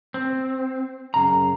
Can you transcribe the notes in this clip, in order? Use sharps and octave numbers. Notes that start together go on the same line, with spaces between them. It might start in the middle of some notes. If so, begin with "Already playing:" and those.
C4
F#2 C#3 A#5